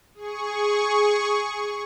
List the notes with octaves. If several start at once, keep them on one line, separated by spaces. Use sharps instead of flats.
G#4 C#6